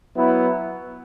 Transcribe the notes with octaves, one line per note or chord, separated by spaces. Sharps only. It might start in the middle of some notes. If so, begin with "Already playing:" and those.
F#3 B3 E4